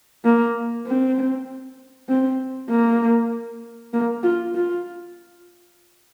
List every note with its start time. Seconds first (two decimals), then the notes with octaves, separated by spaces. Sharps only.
0.24 A#3
0.86 C4
2.09 C4
2.70 A#3
3.93 A#3
4.23 F4
4.54 F4